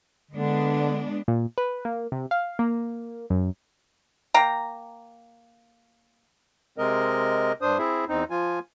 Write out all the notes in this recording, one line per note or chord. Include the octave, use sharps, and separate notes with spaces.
D3 G#3 B3 D4
A#2
B4
A#3
C3
F5
A#3
F#2
A#3 G5 A#5
C3 G#3 C4 A#4 D#5
G2 D4 C5 D#6
C4 E4 G#4 E5
E2 C4 D#4
F3 F4 G#5